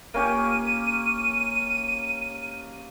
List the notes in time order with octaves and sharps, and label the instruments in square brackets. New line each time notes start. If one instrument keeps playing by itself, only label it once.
[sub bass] F1 [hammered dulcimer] A#3 C#4 G4 [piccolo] D#7